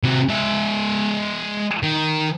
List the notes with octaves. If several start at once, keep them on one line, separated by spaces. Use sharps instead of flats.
C3 F#4
G#3 E5
D#3